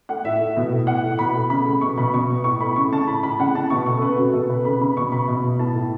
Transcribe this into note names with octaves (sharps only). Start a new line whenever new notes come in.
A3 F#5
A2 E5
A2
B2
A3
A2 F#5
A2
B2 B5
A3
C#3 B5
C#3
B2 C#6
B2 B5
B2 C#6
B3
A2 C#6
A3 B5
C#3 C#6
C#3 A5
A2 B5
A2 B5
C#3 F#5
C#3 A5
B2 C#6
A3 C#6
A4
C#3 B4
C#3 F#4
B2 A4
B3 B4
C#3 B5
C#3 B5
B2 C#6
B3 B5
B2
B2
A2 A5
A2